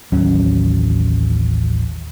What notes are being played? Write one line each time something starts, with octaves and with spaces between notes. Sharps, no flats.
A1 D#2 F#3 C#4